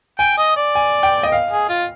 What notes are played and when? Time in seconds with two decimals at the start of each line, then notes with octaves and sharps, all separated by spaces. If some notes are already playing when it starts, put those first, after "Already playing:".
0.19 G5 G#5
0.38 D#5
0.56 D5
0.75 G#5
1.03 G5
1.23 D#5
1.32 F5
1.51 G#4
1.69 F4